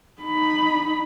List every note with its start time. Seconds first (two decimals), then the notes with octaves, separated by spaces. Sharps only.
0.22 D#4 B5